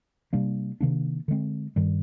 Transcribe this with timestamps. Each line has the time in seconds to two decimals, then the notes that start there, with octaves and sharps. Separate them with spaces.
0.33 C3 G3 A#3 D4
0.81 C3 D#3 A#3 D4
1.28 D3 G#3 C4
1.76 G2 D#3 G3